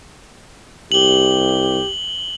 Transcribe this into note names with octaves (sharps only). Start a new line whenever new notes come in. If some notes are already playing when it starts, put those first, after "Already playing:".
C2 G4 F#7 G7